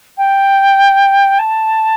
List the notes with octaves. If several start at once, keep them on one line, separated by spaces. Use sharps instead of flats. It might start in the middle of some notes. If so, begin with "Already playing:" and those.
G5
A5